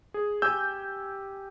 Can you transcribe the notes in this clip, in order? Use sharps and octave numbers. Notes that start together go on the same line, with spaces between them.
G#4
G4 G#5 E6 G6